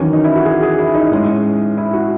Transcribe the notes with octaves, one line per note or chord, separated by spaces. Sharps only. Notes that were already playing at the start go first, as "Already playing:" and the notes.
Already playing: E2 D#3 F#3 C#4
D#4
E4
F#4
G#4
G#4
E4
D#4
A2 G#3 C#4
E4
F#4